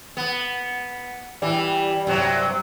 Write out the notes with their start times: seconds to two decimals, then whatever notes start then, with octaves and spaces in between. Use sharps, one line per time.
0.17 B3
1.42 E3 G3 G4
2.07 G2 C3 F#3